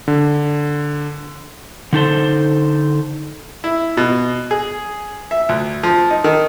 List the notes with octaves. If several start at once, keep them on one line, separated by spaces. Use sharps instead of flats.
D3
D3 D#4 A4 C5
E4
B2
G#4
E5
D2
F3
D#4
D#3